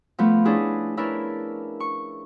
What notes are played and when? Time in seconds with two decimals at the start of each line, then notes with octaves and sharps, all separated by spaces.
0.19 F3 A3 B3
0.45 C#4 D4 E4 G#4 B4
0.97 C#4 D4 E4 A#4 B4 E5
1.80 C#6